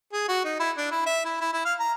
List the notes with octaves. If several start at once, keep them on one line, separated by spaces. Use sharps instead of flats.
G#4
F#4
D#4
E4
D4
E4
E5
E4
E4
E4
F5
A#5